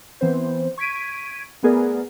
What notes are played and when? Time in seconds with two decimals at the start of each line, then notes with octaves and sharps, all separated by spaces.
0.21 E3 B3 C4 C5
0.78 C#6 G#6 B6 D7 D#7
1.63 A3 B3 G#4 A#4 D5